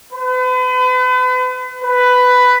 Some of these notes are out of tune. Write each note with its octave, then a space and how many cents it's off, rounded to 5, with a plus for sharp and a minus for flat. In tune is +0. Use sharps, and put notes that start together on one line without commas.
B4 +40
B4 +10